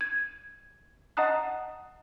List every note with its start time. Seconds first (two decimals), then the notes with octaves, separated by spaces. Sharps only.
0.01 G#6
1.17 D#5 F#5 A5 A#5 D#6 F#6